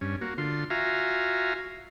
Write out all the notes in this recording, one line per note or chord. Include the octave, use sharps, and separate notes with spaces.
G2 C#4
A#3 F#4
D3 F4 C6
F4 F#4 E5 F5 G#5 A#5